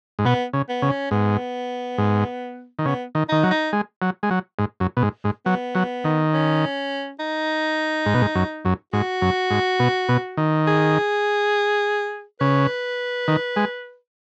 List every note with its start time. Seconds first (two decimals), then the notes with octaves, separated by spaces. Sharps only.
0.19 G#2
0.25 B2 B3
0.53 C#3
0.69 B3
0.82 C#3
0.89 C#4
1.11 G#2 B3
1.98 G#2
2.79 D#3
2.85 C#3 B3
3.15 D#3
3.29 D#3 D#4
3.43 F#3
3.51 D#4
3.73 G#3
4.02 F#3
4.23 G#3
4.31 F#3
4.59 G#2
4.80 F#2
4.97 B2
5.02 G#2
5.24 G#2
5.46 F#3 B3
5.75 F#3
6.04 D#3
6.33 C#4
7.20 D#4
8.06 G#2
8.14 B2
8.22 G#2
8.35 F#2
8.65 F#2
8.93 G#2 F#4
9.22 F#2
9.51 G#2
9.79 B2
10.09 B2
10.37 D#3
10.67 G#4
12.40 C#3 B4
13.28 D#3
13.56 G#3